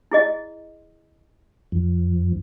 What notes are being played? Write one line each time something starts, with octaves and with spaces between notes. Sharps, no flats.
E4 G#4 D#5
F2